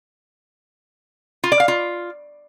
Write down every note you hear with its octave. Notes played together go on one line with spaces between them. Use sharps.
F4
D5
F5
F4